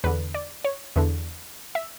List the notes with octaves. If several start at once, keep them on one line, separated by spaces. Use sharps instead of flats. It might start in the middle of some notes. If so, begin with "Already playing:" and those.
E2 D3 B4
D5
C#5
E2 D3
E5